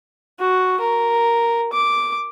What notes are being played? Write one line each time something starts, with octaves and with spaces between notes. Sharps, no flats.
F#4
A#4
D6